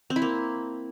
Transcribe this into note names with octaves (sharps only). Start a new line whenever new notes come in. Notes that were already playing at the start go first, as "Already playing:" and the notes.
C4
E4
A#3